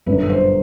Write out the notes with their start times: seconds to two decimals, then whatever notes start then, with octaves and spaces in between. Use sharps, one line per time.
0.06 G1 F#2 D3 B4
0.30 C5